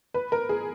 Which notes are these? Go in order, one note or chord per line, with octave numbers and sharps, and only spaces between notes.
B4
A#4
G#4